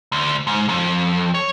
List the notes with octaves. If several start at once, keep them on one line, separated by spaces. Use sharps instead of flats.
D2
G#2
F2
C#5